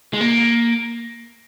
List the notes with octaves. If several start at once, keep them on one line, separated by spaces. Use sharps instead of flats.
G#3
A#3